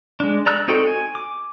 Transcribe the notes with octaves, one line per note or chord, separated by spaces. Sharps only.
G#3 D4
D5 A#5 E6 F#6
C4 D#4 F#4 A4 G5
G#5
D6